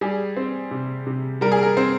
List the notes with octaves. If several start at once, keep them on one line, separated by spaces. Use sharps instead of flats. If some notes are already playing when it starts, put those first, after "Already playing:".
G3 G#4
C4
C3
C3
G3 A#4
G#4
A#4
C4